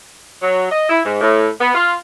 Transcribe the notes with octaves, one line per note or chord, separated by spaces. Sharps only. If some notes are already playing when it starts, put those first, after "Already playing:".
F#3
D#5
E4
G#2
A2
B3
F4